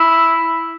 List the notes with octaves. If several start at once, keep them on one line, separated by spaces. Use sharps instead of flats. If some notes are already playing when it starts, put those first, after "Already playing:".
Already playing: E4